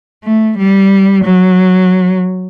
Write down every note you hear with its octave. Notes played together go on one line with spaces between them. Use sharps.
A3
G3
F#3